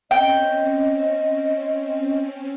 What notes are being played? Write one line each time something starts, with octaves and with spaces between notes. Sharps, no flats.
C4 C#4 D#5 G5